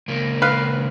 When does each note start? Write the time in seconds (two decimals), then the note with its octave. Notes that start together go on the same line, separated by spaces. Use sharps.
0.08 C#2 A#3
0.42 B4 F5